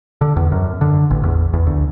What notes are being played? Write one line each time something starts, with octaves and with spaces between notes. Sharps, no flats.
D3
E2
F#2
D3
A1
E2
E2
D2